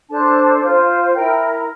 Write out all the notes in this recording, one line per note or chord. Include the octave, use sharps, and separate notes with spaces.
D4 A4 C5 A5
F4 C5
E4 A#4 G5